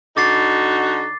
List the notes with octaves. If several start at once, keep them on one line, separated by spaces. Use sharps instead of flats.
D3 D#4 F#4 D6 A6 C7